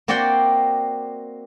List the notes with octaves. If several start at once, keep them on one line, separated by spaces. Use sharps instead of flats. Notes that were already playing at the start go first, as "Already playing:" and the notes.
A#3 C4 F#4 D5 F#5 G5